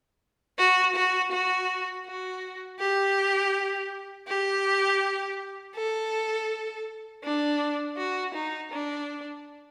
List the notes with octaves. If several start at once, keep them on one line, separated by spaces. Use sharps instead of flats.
F#4
F#4
F#4
F#4
G4
G4
A4
D4
F#4
D#4
D4